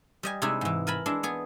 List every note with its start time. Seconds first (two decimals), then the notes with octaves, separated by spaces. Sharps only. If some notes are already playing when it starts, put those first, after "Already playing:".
0.23 G3 D#5 G#5
0.42 C3 G#3 D#4 E4 G#4
0.61 G#2 E3
0.87 A#4 G#5 A5 B5
1.06 G#3 D4 E4
1.23 B3 G#4